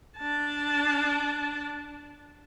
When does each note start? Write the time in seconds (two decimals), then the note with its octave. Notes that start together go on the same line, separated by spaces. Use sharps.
0.18 D4 A5